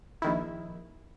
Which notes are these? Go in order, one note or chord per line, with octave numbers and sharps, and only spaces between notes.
A#1 D#3 E4